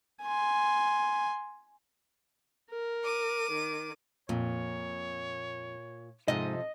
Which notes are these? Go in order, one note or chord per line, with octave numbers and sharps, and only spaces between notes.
G#5 C6
A#4
D6 D#7
D#3
F2 A#2 C#5
G#2 C3 F3 A4 D#5